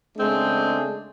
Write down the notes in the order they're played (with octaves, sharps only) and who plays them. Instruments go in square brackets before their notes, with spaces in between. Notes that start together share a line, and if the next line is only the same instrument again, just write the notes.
[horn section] C#3 G#3 A3 C4 D4 G#4